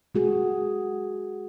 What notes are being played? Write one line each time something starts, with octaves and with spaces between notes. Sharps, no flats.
G#3 F#4 G#4